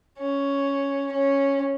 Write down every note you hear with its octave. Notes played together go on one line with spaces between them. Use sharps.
C#4
C#4